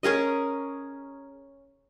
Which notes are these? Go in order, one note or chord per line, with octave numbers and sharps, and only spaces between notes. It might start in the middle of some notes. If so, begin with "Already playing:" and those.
C#4 G#4 A#4 D#5